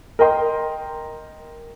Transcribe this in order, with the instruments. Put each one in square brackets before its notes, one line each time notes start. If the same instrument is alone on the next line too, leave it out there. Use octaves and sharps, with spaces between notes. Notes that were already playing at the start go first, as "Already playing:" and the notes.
[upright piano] A#4 D#5 G5 C6